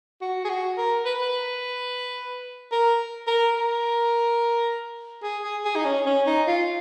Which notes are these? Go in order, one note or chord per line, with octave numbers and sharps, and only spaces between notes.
F#4
G#4
F#4
A#4
B4
B4
A#4
A#4
A#4
G#4
G#4
G#4
D#4
C#4
C#4
D#4
F4